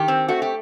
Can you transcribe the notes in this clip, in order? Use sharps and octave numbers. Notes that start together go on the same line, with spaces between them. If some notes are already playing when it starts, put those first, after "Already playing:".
Already playing: D#3 G4
C4
A3 F#4
G4